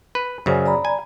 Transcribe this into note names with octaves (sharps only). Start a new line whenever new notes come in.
B4
F#2 C#3 C5 D5 G#5
D5 A#5 B5
G#5